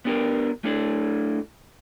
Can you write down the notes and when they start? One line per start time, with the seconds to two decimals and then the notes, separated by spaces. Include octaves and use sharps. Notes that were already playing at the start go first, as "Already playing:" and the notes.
0.05 B3 D4 G4 A4 A#4
0.64 A3 D4 E4 A4 D5